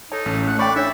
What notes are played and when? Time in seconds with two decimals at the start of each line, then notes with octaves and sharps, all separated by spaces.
0.12 D#4 A4 C#5 A5
0.26 A1 C#4 A4
0.47 A3 F#5
0.59 C#5 D5 G5 B5 C#6
0.76 D4 C#5 E5